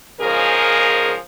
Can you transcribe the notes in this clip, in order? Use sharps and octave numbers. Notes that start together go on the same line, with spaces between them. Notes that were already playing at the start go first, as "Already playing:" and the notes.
G#2 C#3 F3 G#4 A#4